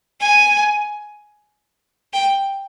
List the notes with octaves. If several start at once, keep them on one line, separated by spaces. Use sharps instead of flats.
G#5
G5